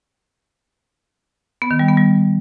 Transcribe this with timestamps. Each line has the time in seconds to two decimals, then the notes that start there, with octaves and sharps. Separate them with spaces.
1.62 B3
1.71 D#3
1.79 G3
1.88 B3
1.97 G3